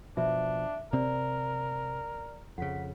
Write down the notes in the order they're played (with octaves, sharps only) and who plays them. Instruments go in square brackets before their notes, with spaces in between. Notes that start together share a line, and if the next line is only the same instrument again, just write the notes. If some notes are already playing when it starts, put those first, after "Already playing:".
[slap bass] B2 F3 [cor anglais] D4 [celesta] E5
[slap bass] C3 C4 [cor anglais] A#4 [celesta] D5
[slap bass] F2 C#3 [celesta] F#5 B6